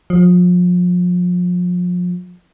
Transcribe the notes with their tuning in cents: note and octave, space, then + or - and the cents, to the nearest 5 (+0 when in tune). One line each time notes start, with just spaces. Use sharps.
F3 +35